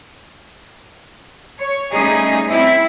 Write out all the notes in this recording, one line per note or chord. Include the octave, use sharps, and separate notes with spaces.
C#5
G3 A3 C#4 D#4 G#4
C4 E4